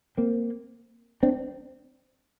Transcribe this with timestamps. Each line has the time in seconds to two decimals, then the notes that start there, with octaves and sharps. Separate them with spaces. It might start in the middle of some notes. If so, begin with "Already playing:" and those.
0.17 A#3 C4
1.23 C4 D4